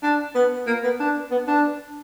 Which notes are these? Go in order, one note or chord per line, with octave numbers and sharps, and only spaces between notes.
D4
B3
A#3
B3
D4
B3
D4